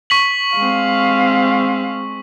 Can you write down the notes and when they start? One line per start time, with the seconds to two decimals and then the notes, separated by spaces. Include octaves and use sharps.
0.10 C#6 B6 F#7
0.57 G#3 C4 F5